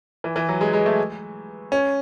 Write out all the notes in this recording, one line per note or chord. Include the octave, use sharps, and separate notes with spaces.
E3
E3
F#3
G#3
G#3
A3
C#4